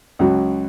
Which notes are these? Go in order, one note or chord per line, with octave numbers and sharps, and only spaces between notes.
C#2 C#3 F#3